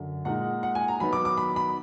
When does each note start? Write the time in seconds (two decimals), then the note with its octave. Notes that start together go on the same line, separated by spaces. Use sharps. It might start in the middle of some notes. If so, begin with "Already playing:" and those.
Already playing: F#2 D3
0.25 A#2 G#3 D#4 F#5
0.63 F#5
0.75 G#5
0.88 A#5
1.00 D#3 F#3 B3 D#4 B5
1.13 D6
1.25 D6
1.37 B5
1.56 B5